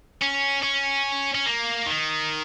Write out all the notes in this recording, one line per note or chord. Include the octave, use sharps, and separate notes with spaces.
C#4
C#4
C#4
A#3
D#3